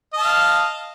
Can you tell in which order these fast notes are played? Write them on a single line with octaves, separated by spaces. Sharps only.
D#5 A5 F5